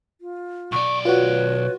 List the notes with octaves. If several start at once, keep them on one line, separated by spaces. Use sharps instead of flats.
F4
B1 D5 C#6
F4 F#4 B4 C#5